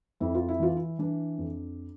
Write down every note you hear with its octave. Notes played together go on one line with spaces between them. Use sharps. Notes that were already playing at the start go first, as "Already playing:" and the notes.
F2 E4
F4
E4
E3 F4
E4
E3 D4
F2